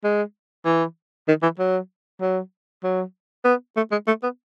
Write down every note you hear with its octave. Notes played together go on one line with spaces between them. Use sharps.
G#3
E3
D#3
E3
F#3
F#3
F#3
B3
A3
G#3
A3
B3